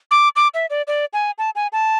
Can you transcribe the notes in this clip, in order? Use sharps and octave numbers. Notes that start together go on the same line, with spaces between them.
D6
D6
E5
D5
D5
G#5
A5
G#5
A5